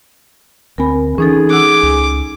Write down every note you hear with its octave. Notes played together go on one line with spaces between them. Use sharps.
D2 C4 A#4 G#5 B5
E3 C#4 D#4 G#4 A4
F#5 D6 E6 F#6
C#2